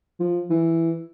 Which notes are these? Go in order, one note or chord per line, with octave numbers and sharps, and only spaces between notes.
F3
E3